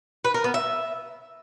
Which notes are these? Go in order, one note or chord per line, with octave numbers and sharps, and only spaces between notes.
B4
A#4
B3
E5